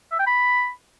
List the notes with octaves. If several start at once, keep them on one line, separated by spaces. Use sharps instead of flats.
E5
G5
B5